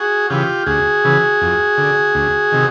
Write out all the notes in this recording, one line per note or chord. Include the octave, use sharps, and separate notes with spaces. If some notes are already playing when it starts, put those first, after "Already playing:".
Already playing: F#4 G#4
C#3 E3 F4 G4
D2 F#4 G#4
C#3 E3
F2
D3
D2
C3 D#3